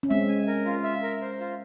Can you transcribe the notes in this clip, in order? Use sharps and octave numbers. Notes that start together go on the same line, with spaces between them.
C#4
G#3 C4 E5
G#5
A#4
F4
E5
A#4
C5
F4